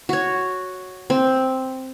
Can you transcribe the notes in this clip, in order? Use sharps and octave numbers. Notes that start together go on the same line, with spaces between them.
F#4 C#5
C4